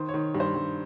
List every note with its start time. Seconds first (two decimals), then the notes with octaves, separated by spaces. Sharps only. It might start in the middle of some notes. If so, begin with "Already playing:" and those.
Already playing: D#3 C5
0.08 C#5
0.14 D#3
0.35 G2
0.40 C5
0.55 G2